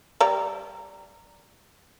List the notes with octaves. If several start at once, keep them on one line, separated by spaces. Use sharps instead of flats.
G3 D5 A#5